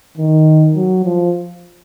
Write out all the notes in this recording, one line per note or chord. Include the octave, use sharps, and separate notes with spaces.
D#3
F#3
F3